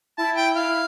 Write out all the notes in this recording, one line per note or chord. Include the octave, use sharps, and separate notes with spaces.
E4 A5
G5
E4 F5
E4